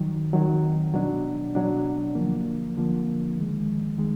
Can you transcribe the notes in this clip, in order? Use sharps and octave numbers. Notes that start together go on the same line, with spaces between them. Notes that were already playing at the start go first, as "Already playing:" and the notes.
Already playing: F2 D#3 F#3
F2 D#3 F#3
B2 F#3 D4
B2 F#3 D4
D3 F3 A#3
D3 F3 A#3
F2 D#3 G#3
D#3 G#3